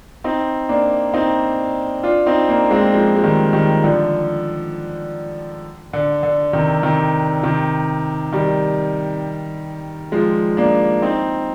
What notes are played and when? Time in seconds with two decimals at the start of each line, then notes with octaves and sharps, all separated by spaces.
0.24 C4 D#4
0.69 A#3 D4
1.14 C4 D#4
2.03 D4 F4
2.26 C4 D#4
2.49 A#3 D4
2.71 G#3 C4
2.94 F3 G#3
3.16 G#3
3.24 D#3 G3
3.53 D#3 G3
3.83 D3 F3
5.93 D3
6.23 D3
6.53 C3 D#3
6.83 C3 D#3
7.43 C3 D#3
8.32 D#3 G3
10.12 F3 G#3
10.57 A#3 D4
11.02 C4 D#4